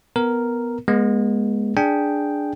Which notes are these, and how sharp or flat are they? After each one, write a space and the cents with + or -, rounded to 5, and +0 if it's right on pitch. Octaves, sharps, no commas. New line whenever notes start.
B3 +0 A#4 +0
G#3 +0 B3 -35
D4 +0 G#4 +0 G5 +0